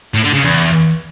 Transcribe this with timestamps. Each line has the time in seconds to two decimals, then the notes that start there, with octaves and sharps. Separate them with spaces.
0.14 A2
0.24 D3
0.33 C#3
0.43 E2